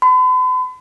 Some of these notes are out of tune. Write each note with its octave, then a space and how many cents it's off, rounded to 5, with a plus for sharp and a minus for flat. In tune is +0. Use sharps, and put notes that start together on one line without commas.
B5 +45